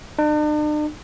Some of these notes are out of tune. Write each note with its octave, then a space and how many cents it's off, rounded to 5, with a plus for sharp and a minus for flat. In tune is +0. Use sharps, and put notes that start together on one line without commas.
D4 +45